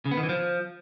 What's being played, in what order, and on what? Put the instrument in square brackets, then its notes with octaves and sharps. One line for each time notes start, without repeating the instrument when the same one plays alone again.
[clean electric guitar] C#3
B3
D#3
E3
F3